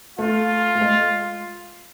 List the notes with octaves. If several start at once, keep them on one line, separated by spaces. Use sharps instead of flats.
A3 F4
A3
G#3